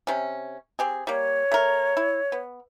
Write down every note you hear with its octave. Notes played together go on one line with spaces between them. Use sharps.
C3 C#4
C4 G4 G#4
G3 A#3 C#5
A3 A#4
E4
B3